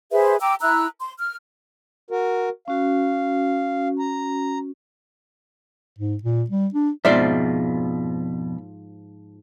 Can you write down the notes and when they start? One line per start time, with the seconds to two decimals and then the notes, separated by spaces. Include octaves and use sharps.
0.12 G#4 B4 C5 E5
0.40 G5 A#5 D6 E6
0.60 E4 A#5 E6 F#6
0.99 C6
1.19 F6
2.11 F#4 A#4
2.68 C#4 F#4 F5
3.99 A#5
5.99 G#2
6.23 A#2
6.50 G3
6.74 D4
7.05 F2 G#2 B2 F3 F4 D5 E5